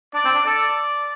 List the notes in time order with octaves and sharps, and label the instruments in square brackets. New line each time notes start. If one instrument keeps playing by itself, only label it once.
[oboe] D4 [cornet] D5
[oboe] C4
D4
[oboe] A4 [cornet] D5